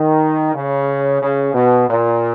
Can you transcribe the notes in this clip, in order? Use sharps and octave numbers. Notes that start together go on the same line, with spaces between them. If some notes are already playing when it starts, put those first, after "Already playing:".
Already playing: D#3
C#3
C#3
B2
A#2